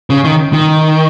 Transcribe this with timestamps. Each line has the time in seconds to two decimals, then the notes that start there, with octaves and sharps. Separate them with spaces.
0.10 C#3
0.24 D#3
0.53 D#3